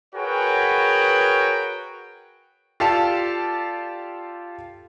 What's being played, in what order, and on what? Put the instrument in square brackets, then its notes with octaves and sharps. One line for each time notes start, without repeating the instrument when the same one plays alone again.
[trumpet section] F#4 G#4 A#4 B4 C#5 G5
[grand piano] F4 G4 A4 D5 F5 A5